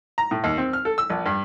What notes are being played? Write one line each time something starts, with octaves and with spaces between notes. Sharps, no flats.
A#5
A2
D#2
C4
F6
A4
E6
A#1
G2